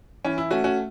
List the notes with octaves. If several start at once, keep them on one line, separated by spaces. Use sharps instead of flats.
E3 C#4
E4
A3 C#4 F#4
C#4 F#4